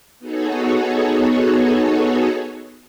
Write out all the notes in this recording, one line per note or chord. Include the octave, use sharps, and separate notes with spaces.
B3 D#4 F#4 G#4 A4 C#5